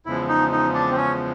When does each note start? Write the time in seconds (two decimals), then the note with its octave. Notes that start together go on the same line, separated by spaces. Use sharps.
0.06 E2 C#3 F3 G#3 E4
0.28 D#4
0.52 D#4
0.74 D4
0.91 C4
0.97 C#4